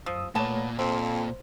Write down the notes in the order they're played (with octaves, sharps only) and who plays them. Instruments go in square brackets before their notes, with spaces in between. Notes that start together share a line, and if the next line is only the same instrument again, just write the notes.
[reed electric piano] F#2 D#6 E6 [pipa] F3
[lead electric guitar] A#2 [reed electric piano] A3 C#5 [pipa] B3 A5
[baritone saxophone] F2 [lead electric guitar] A#2 [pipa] C4 [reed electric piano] C5